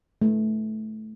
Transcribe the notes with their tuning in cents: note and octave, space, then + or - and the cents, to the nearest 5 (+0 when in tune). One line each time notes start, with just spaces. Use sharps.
A3 -20